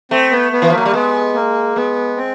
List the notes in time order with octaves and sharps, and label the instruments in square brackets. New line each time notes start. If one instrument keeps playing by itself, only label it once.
[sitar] A3 [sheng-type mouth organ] C4
[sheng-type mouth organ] B3
B3
[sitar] E3
F3
[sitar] F#3 [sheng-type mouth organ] A#3
[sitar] G3
[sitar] G#3 [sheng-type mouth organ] B3
[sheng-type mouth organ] A#3
[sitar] G#3 [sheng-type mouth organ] B3
[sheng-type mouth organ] C4